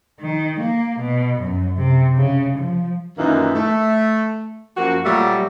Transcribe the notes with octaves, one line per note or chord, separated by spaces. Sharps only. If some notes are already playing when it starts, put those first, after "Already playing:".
D#3
A#3
B2
F#2
C3
C#3
F3
F#2 A#2 D#3 E3 A#3 D#4
A3
F#2 F3 A#3 F#4
A#2 F#3 G3 A3 A#3